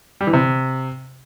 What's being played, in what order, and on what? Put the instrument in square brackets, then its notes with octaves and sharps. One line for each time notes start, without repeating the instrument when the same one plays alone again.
[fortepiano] G3
E3
C3